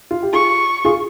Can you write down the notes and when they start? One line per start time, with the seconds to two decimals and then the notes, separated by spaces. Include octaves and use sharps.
0.11 F4
0.23 G4
0.33 F4 G#4 C#6
0.85 F4 G#4